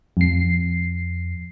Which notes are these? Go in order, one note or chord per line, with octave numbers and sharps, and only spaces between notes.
F2 C7